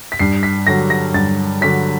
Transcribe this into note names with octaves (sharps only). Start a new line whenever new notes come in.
B6
G2 C7
B6
D3 F#3 A#6
A#6
G2 A6
D3 F#3 B6